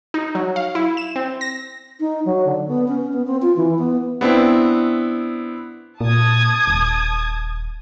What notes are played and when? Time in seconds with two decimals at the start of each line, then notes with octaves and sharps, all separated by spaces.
0.14 D#4
0.35 F#3
0.56 F5
0.75 E4
0.97 E7
1.16 C4
1.41 A#6
2.00 D#4
2.25 F#3
2.45 D3
2.68 B3
2.88 C#4
3.13 B3
3.26 C4
3.42 F4
3.57 E3
3.78 B3
4.21 B3 C4 D4 E4
6.01 A#2 A5 D#6 G#6
6.67 D#1